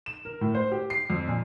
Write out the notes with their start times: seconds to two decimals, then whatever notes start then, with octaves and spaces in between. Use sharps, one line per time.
0.06 E7
0.25 A#4
0.41 A2
0.55 C5
0.72 G4
0.90 C7
1.10 F2
1.28 A#2